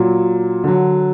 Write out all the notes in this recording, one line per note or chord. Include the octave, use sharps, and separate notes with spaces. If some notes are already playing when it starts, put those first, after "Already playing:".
Already playing: A#2 F#3
D3 F#3